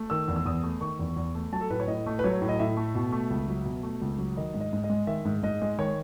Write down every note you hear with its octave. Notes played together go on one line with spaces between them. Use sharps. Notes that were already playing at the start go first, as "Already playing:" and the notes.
Already playing: A3
D#3 E6
E2
E6
E2 D#6
A3
D#3 C#6
E2
E2
A3
F#3 A5
A4
A2 B4
C#5
A2 D#5
A3
B4
F#3 C#5
A2
D#5
A2 E5
A3
B2
A3
C#2
F#3
B2
A3
C#2
F#3
D#3 D#5
G#2
D#5
G#2
D#5
G#3
D#3 E5
G#2
G#2 D#5
G#3
D#3 C#5